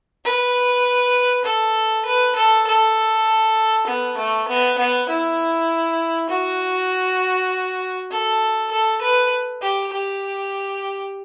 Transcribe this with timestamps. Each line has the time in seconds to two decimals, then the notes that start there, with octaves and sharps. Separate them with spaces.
0.24 B4
1.45 A4
2.05 B4
2.36 A4
2.67 A4
3.87 B3
4.18 A3
4.48 B3
4.78 B3
5.09 E4
6.30 F#4
8.11 A4
8.71 A4
9.02 B4
9.62 G4
9.92 G4